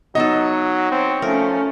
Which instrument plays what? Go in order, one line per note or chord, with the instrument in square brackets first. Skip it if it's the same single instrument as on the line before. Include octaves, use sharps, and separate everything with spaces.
[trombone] F#3 [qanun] B3 D#4 A4 [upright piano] D#5
[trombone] C4 [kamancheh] C#5
[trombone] F3 [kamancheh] A3 C#4 [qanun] A#4